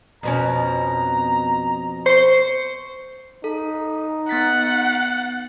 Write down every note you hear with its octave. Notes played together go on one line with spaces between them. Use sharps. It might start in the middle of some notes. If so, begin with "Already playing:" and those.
F2 B2 C#4 A#5
C5 C#6
D#4 A4
B3 F#5 A6 B6